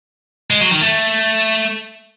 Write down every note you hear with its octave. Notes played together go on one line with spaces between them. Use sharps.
G#3
F#3
D#3
A3